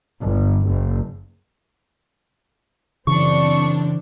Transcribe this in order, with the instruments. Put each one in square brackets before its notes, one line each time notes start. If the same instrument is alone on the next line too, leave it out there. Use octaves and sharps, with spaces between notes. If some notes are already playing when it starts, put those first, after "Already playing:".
[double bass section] G1
F#1
[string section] F#2 C4 D4 [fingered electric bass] C#3 E3 [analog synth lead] C#6